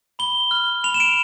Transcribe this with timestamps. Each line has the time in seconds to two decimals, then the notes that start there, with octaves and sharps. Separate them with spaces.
0.19 B5 G7
0.51 F6
0.84 B5 F7
0.94 E7
1.00 D7